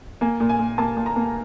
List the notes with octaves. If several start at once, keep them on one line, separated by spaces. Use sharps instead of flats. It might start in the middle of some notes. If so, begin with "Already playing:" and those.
A#3 G#5
A#2
G#5
A#2
A#3 A5
A#2
A#5
A#3